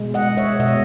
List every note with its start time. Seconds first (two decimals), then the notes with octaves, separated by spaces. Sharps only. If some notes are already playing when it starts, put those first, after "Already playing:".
Already playing: B2 G#3
0.14 D#5 F#5
0.37 C#5 E5
0.60 B2 G#3 D#5 F#5